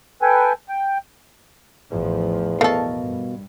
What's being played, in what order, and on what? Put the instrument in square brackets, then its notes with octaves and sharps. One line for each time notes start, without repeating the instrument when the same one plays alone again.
[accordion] A4 B4 G5 G#5
G5
[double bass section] A1 A2 F3 [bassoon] E2
[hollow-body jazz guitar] B2 A#4 F5 [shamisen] A3 A4
[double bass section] G2